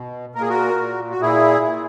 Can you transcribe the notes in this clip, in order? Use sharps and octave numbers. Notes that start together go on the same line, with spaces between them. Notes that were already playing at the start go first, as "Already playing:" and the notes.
Already playing: B2
A#2 A#4
G#4
F#4 A#4
A#2
F#4
A#2 E4 G#4
A#2